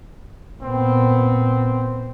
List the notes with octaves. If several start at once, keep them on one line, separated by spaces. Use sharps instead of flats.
A#2 B3 C4